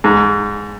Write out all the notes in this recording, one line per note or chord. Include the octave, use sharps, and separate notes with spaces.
G#2